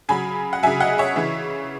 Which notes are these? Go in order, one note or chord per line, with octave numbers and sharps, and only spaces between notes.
C#3 F#3 G#5 B5
F#5
C#3 F#3 E5 G#5
D#5 F#5
C#5 E5
C#3 E3